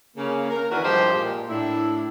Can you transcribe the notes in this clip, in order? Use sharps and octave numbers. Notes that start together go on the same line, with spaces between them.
C#3 A#3
A#4
D#3 E3 D4 E4 F#4 A#4
G2 F3 G#3 G4 C5 D#5
A#2
A2 D4 E4